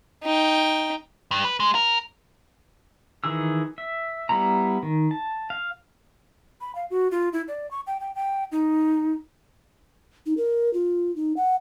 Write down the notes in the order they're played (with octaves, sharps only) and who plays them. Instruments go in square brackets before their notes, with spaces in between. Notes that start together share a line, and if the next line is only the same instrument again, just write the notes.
[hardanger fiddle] D#4 G5
[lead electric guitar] G2
B4
G#3
A#4
[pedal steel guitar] D#3 E3 G#4 E6
E5
G3 B3 E4 A#5
D#3
A5
F5
[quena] B5
F5
F#4
F4
E4
D5
C#6
G5
G5
G5
D#4
[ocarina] D#4
A#4
F4
D#4
F#5